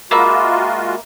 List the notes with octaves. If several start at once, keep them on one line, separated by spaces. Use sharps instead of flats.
G#3 A#3 F4 F#4 E5 B5